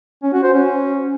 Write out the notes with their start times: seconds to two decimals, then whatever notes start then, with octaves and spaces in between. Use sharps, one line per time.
0.23 C#4
0.33 F#4
0.43 C5
0.54 C#4